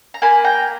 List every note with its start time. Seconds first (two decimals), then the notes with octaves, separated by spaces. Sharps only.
0.14 A#5
0.22 A#3 G#5 B5
0.44 G5 A#5